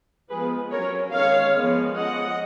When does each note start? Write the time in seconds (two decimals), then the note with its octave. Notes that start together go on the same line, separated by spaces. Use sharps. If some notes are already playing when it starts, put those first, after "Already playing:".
0.29 F3 G#3 B3 G#4 B4
0.71 F#3 C#4 A#4 C#5
1.12 D#3 G#3 C#4 C#5 F5
1.53 F3 G#3 B3
1.95 F3 G#3 C#4 D#5 F#5